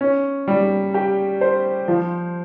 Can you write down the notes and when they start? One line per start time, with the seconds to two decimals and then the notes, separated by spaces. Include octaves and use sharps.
0.01 C#4
0.48 G3
0.94 G4
1.41 C5
1.88 F3